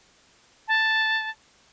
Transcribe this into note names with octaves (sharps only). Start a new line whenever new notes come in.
A5